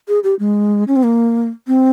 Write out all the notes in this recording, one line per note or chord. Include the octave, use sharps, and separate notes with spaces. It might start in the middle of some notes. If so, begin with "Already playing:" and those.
G#4
G4
G#3
C#4
C4
A#3
C4